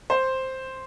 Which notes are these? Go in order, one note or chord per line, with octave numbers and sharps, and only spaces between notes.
C5